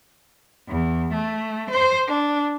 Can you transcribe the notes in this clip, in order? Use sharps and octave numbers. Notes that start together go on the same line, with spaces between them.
E2
A3
C5
D4